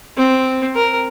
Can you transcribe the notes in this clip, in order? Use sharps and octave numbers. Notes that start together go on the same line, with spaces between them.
C4
A#4